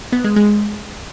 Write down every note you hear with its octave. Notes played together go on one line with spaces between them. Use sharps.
B3
G#3
G#3